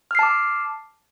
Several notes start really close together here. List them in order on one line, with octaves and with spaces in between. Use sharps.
F6 C7 A5 D6